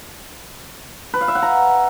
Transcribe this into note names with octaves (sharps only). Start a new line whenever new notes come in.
B4
F5
E5
F#5
A#5